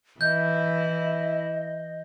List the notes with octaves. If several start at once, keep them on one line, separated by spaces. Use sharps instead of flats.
E3 E4 D#5 G6